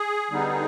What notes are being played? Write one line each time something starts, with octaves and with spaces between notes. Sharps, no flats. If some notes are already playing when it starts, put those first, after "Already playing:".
Already playing: G#4
D3 G3 B3 D#4